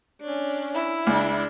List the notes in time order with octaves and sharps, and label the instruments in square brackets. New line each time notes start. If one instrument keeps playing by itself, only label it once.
[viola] C#4 D4
[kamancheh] E4
[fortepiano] C#2 [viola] D4